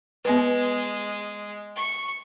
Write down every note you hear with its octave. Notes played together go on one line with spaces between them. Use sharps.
G#3 B3 B4
C#6